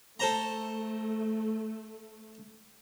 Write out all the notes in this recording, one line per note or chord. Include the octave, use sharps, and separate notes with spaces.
A3 A4 C5 A#5